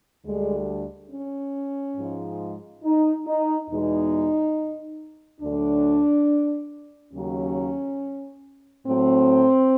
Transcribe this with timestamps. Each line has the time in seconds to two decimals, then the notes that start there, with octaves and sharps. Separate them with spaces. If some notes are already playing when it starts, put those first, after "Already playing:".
0.25 D2 D3 G3 G#3
1.11 C#4
1.97 G#2 F3 G#3
2.84 D#4
3.27 D#4
3.69 E2 B2 G#3 D#4
5.41 D2 D3 F#3 D4
7.13 D#2 C#3 F#3 C#4
8.86 A2 F#3 C4